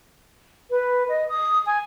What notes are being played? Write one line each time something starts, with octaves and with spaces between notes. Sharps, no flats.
B4
D#5
D#6
G#5